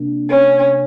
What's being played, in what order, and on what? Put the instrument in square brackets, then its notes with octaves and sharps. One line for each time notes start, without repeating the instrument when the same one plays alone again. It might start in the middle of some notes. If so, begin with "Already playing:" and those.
Already playing: [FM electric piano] C3 A#3 D4
[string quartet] C#4